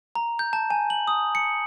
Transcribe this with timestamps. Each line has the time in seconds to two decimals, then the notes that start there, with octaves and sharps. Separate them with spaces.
0.15 A#5
0.39 G6
0.53 A5
0.70 G#5
0.90 F#7
1.08 D#6
1.35 C#7